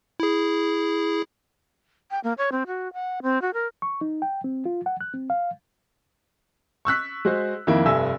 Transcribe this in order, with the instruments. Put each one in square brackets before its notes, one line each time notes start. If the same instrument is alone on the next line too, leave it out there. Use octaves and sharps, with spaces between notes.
[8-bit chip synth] E4 G#4
[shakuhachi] G5
A#3
C#5
C4
F#4
F#5
C4
F#4
A#4
[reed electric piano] C#6
D#4
G5
C4
F4
F#5
F#6
C4
F5
[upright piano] C#6 E6 F#6 B6
G#3 F#4 C5
F2 D#3 A#3 E4
F1 G2 A4 E5 G#5 E6